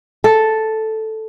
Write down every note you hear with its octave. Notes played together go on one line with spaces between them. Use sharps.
A4